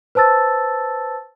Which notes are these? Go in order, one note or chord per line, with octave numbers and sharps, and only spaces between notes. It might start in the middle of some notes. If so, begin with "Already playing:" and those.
B4 C5 A5 E6 A6